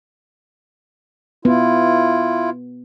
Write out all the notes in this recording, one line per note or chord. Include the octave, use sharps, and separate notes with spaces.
B3 E4 F4